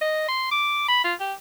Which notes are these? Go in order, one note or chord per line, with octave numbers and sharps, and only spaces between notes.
D#5
C6
D6
B5
F4
G4